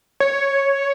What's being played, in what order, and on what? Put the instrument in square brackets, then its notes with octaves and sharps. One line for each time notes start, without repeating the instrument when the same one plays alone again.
[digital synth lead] C#5